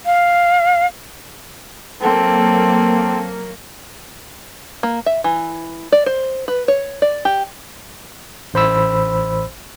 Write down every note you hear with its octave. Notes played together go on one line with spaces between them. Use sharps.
F5
F#3 A#3 C4 A4
A#3
E5
E3
D5
C5
B4
C#5
D5
G4
A1 C5 B5 E6